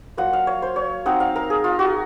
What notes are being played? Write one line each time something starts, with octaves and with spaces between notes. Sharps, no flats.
F#3 A#3 F4 F#5
F5
C#5
C5
C#5
F#3 C4 D#4 F#5
F5
A#4
G#4
F4
F#4